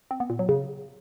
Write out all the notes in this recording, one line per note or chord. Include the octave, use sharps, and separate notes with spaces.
C4
B3
A#2
F#3
C#3